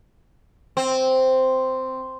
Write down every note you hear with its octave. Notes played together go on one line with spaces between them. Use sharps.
C4